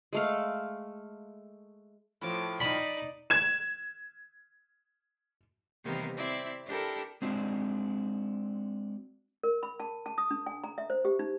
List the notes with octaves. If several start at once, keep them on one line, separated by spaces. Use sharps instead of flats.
G#3 A3 F5
A2 F3 D6
D#4 D5 B5
G#6 E7
C3 D#3 E3 G3 A#3 B3
C4 E4 D5 E5
D4 E4 G4 A4 A#4
G#3 C4 D4 F#4
A#4
B5
A5
A5
D#6
D4
G#5
A#5
E5
C5
G4
D#4